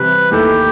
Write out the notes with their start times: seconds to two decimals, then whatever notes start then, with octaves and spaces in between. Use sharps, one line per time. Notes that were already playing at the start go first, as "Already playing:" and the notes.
Already playing: C3 E3 G3 B4
0.31 D#2 D#3 A3 E4 G4 A4